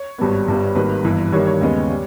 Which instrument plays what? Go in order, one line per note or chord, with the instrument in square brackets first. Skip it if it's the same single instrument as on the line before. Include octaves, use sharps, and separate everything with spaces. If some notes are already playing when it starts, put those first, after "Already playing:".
Already playing: [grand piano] C#5
G#1 G2 G3 B3
G1 G2 G3 B3
G#1 G2 D#3 A#3 B4
G1 G2 E3
G2 D#3 G3 A#3 C#5
C#5
D#2 C#3 G#3 B3
G3